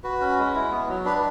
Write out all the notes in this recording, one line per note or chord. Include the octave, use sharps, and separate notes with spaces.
F#4 B4
C#4
G#3
E4
B3
F#3
D4 B4